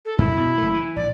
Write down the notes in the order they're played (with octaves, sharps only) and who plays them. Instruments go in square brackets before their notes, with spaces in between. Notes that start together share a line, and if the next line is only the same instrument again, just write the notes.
[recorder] A4
[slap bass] F#2 [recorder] E4
[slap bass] B2
F#1 A3
E3
[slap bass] A#1 [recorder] D5